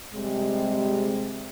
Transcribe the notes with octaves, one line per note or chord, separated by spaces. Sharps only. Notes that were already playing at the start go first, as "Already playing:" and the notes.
C3 G3 G#3